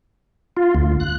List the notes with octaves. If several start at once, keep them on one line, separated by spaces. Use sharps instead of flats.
F4
D2
F#6